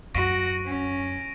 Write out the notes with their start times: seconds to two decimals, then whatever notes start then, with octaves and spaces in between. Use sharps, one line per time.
0.15 F#2 F#4 C#6 A#6 D7
0.66 C#4